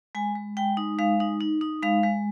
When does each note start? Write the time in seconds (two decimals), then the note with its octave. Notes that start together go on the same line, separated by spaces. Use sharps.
0.15 G#3 G#5
0.36 G#3
0.57 G#3 G5
0.77 D#4
0.99 G#3 F5
1.20 D#4
1.40 D#4
1.61 D#4
1.82 G#3 F5
2.03 G#3